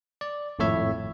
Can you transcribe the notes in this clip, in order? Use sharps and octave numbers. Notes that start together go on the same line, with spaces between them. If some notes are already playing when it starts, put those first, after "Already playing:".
D5
G#1 F2 A2 E4 C#5 E5